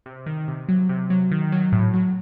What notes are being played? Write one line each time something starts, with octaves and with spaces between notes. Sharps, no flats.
C3
D#3
C3
F#3
C3
F#3
D#3
F#3
A2
F#3